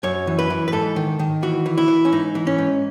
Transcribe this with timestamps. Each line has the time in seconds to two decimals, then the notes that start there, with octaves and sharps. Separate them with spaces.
0.03 F#2 C#5
0.27 E3
0.39 B4
0.50 E3
0.68 B4
0.72 G#2 A4
0.96 D#3
1.19 D#3
1.42 E3 F#4
1.66 E3
1.78 E4
1.88 E3
2.05 C#4
2.12 G#2 D#4
2.35 E3
2.47 C#4
2.58 G#2